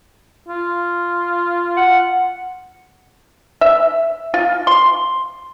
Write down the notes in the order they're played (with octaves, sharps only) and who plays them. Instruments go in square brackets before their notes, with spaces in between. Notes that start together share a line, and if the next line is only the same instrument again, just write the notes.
[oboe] F4
[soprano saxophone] F#5
[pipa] E5
F4
C6